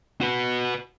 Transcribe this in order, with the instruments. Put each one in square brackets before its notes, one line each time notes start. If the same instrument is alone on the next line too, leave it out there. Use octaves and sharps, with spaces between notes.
[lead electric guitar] F#4 B4